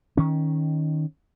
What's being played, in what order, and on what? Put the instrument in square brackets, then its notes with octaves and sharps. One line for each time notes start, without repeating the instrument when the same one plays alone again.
[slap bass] D#3 C#4